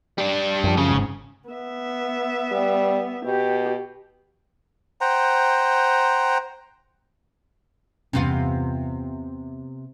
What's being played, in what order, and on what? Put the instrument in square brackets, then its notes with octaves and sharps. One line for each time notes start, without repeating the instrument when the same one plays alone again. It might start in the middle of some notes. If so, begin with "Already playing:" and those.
[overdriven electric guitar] G3 D4
[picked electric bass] F#2 F3
[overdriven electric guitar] C#3
[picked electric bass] G1 G#2
[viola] B3 E5
[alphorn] G3
[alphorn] B2 [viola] G4
[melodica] C5 F#5 G5 A#5
[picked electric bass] E2 G2 C#4 [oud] C3 B3 F4